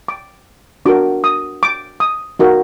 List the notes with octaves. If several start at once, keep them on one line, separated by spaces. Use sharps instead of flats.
D6
D4 F#4 A#4 D6
D#6
D6
D#6
D#4 F#4 A#4